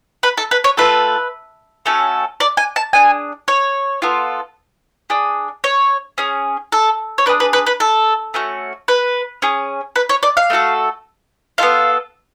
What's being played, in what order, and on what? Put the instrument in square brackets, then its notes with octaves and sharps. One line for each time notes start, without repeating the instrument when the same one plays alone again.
[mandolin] B4
A4
B4
C#5
A3 F4 A4 B4
A3 C#4 F#4 A4
D5
G#5
A5
D4 G#4 G#5
C#5
B3 F4 A4
D4 G#4
C#5
C#4 G#4
A4
C#5
D4 G#4 B4
B4
B4
B4
A4
A3 C#4 F#4
B4
C#4 G#4
B4
C#5
D5
F5
A3 D4 F#4 A4
B3 F4 A4 F5